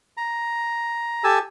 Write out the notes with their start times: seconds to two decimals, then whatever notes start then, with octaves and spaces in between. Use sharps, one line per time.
0.17 A#5
1.24 G4 A4 G#5 A5 E6